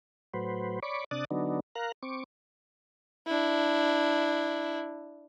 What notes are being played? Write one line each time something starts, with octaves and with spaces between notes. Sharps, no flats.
A2 F#3 B4 C5
C#5 D5 B5 C#6 D6
C3 D4 D5 D#6 F#6 A6
D3 F#3 B3 D4 D#4
A#4 F5 A#5 F#6
C4 C#6 D6
D4 E4